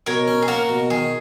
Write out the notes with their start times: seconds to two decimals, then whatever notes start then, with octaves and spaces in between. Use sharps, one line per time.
0.06 B2 A#4 C#5
0.28 C#4
0.42 G#4
0.48 A#3 F#4 A#4
0.69 B2
0.90 D#3 G#4